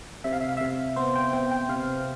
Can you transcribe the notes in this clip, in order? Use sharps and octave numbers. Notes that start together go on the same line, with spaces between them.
C3 E5
F5
E5
F5
C3 E5
B3 C5
G5
B3 G5
G5
C3 F5